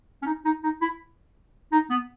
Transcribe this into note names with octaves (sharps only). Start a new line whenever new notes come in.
C#4
D#4
D#4
D#4
E4
D#4
B3